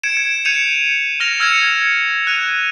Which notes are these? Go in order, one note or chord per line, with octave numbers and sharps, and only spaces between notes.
G#6 C#7 D7 E7
G#6
G6 C#7 D#7 F7
F6 A#6 F7
E6 F6 G#6 A#6 C#7 E7
F#6 G#6 D#7 F7